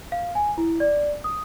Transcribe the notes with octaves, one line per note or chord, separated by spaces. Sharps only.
F5
G#5
E4
D5
D#6